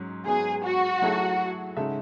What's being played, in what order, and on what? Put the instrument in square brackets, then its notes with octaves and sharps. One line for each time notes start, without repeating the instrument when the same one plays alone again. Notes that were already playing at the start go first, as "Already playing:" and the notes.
Already playing: [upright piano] G#2 F#3 C#4
[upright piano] G#2 F#3 B3 [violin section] G#4
[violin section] F#4
[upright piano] F#3 A3 E4 G#4
C#3 G#3 D#4 A4 E5